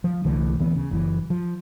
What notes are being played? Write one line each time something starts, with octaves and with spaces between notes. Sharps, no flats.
F3
C2 D3 E3 A3
D#1 D2 E3 B3
C#3
F#1 E3
F3